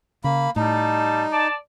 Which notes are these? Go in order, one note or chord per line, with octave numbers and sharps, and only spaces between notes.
C#3 A#3 B5
A2 G3 D#4 A5
D5 A5